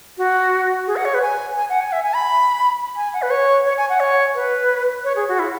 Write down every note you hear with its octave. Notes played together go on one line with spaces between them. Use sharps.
F#4
G#4
F#5
C#5
B4
G#5
G#5
F#5
G#5
E5
G#5
B5
G#5
F#5
B4
C#5
C#5
G#5
F#5
C#5
B4
C#5
G#4
F#4
E4